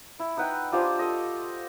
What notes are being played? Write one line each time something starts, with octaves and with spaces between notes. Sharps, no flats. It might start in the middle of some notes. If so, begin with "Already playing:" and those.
E4
D#4 B4 F#5 G5
D4 F4 G4 C5
A4 D#5